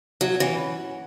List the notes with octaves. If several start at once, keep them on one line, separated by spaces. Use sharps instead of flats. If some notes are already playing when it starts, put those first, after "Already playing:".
F#3 F#4
E3 C#4